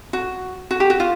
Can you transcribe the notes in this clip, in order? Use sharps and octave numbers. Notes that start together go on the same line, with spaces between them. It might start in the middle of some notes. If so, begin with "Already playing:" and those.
F#4
F#4
G4
F#4
F4